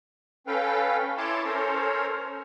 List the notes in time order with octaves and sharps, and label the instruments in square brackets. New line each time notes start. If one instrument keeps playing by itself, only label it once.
[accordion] C#4 A4 B4 F5 G5
E4 C#5 A5 C6 D6
C#4 A4 A#4 C5 C#5